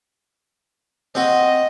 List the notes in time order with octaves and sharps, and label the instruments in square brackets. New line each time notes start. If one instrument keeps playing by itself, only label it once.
[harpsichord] C4 F#4 [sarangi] D#5